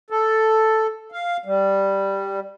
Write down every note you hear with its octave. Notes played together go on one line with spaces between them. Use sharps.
A4
F5
G3